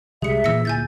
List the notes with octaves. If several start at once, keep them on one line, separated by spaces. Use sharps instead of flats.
C2 G3 G#3 G#4 E5 C#7
A#2 E3 E6 A#6 C#7
D1 A#2 G#5 G6 A6